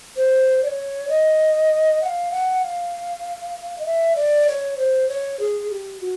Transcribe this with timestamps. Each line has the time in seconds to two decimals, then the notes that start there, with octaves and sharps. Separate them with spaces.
0.16 C5
0.63 D5
0.67 C#5
1.09 D#5
2.02 F#5
2.06 F5
2.31 F#5
2.63 F5
3.78 D#5
3.85 E5
4.16 D5
4.48 C#5
4.78 C5
5.08 C#5
5.40 G#4
5.71 G4
6.01 F#4